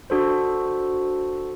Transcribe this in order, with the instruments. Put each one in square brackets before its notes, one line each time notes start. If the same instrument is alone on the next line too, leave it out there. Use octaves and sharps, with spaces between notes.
[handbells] D4 F#4 A4 C5